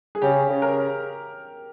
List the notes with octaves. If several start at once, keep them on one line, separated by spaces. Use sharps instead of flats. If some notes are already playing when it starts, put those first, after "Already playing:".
G#4
C#3 G4
C#3
A#4